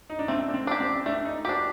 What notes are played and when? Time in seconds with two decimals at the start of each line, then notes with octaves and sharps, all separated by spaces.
0.10 D#4
0.19 D4
0.28 A3 C4
0.49 D4
0.54 C4
0.67 D4 G4
0.80 C4
1.06 A3 D4
1.25 D#4
1.45 F#4 G4
1.49 D4